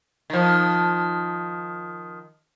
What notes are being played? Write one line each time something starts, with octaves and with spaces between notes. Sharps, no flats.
D#3 F3